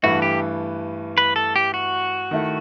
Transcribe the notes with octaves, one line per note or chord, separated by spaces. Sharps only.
G2 E3 A3 E4 F#4
G4
B4
A4
G4
F#4
D#3 A3 E4